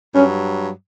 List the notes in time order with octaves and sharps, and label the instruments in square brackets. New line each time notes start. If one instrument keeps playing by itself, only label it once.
[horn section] G2 F#3 [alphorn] C#4